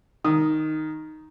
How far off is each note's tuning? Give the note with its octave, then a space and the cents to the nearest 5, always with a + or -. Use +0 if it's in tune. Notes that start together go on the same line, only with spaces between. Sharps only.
D#3 +0 D#6 -10